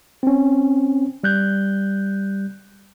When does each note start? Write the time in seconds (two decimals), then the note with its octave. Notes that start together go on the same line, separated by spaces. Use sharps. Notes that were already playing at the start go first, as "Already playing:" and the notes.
0.23 C4 C#4
1.24 G3 F#6 G6